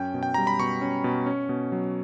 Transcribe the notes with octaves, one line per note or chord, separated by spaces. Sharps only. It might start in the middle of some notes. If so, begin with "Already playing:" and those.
Already playing: F#2 C#4 G5
B2
G5
G3 A#5
B5
B2 C#6
C#4
B2
C#4
B2
F#3